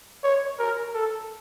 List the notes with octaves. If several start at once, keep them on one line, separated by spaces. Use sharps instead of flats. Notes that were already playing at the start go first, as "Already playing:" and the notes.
C#5
A#4
A4